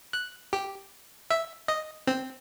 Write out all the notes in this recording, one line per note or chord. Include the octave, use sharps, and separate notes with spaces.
F#6
G4
E5
D#5
C4